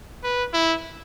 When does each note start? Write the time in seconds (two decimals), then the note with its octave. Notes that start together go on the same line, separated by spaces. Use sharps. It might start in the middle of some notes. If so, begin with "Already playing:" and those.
0.24 B4
0.54 E4